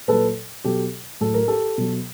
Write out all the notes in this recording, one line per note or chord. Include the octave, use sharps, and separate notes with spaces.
A#2 F#3 A4 B4
B2 F#3 G4 A4
A2 F#3 A4
A#4
G4 A4
B2 F#3